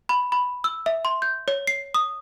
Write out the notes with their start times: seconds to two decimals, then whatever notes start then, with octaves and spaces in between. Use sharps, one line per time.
0.09 B5
0.32 B5
0.64 E6
0.86 E5
1.05 C6
1.22 G6
1.48 C#5
1.67 C7
1.94 D#6